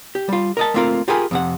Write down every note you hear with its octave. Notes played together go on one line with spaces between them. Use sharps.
G4
G3 F4
A#4 D#5 A5
A3 A#3 C4 F4 F#4 A#4
F4 G4 G#4 A#4 G#5 B5
F2 C3 F#5